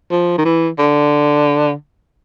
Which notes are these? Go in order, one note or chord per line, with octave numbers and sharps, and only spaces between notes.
F3
D#3
E3
D3